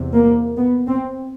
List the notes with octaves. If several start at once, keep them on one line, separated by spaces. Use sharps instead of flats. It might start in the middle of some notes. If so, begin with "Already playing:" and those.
Already playing: E2 C3
A#3
B3
C4